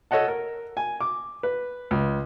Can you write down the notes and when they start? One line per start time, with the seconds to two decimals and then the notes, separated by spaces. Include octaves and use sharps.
0.11 A4 C#5 D#5 F#5 A5
0.28 A#4
0.77 G#5
1.01 D6
1.43 B4
1.91 C#2